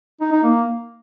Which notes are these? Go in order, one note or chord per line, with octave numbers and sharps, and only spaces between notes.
D#4
D#4
A#3